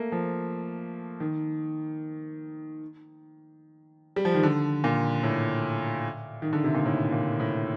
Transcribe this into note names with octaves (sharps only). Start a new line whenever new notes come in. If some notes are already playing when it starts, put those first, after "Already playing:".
Already playing: A3 A#3
F3
D#3
G3
F3
D#3
D3
A#2
A2
D#3
D3
C3
A#2
A2
A#2
A2